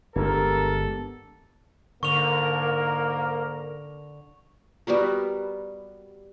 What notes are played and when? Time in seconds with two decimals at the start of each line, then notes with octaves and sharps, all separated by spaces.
0.16 G1 G#3 B3 D4 G4 A4 A#4
2.03 G#2 D3 A#3 A#4 C#6 F7
4.87 G3 B3 F#4 A#4